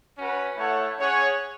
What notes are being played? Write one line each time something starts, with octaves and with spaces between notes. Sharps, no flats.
C#4 F#4 B4
A3 E4 A4 C#5 F#5
C#4 G#4 C#5 F#5